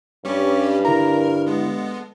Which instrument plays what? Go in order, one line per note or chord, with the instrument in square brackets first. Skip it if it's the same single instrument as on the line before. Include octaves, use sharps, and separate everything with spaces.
[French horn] G2 [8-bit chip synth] G3 C#4 G4 [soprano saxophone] C#5
[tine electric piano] D3 E4 [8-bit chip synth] A#4 [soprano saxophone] A#5
[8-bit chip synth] G#3 B3 [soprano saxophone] A4